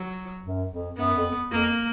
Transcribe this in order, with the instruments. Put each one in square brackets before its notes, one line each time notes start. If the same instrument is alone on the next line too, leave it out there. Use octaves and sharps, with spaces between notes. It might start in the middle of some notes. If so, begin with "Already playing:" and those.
Already playing: [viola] F#3
[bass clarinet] F#2
F2
[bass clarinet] F#2 [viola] B3
[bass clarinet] F2
[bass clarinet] F2 [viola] A#3